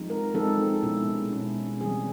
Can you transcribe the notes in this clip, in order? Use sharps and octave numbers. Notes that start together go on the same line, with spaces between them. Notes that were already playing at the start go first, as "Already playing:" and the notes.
Already playing: F3 G#3 C4 D#4
A#4
F3 G#3 C4 D#4 A4
B2 G#3 C#4 E4
B2 G#3 C#4 E4
E3 G3 C4 G#4